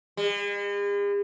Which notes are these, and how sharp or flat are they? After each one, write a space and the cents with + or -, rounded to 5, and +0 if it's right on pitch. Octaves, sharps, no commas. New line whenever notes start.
G#3 -45